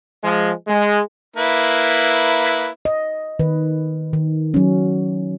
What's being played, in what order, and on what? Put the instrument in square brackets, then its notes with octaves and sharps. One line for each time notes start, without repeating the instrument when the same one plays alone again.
[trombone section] F3 G#3
G#3
[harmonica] A#3 E4 B4
[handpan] D#5
D#3 B4
D#3
F#3 C#4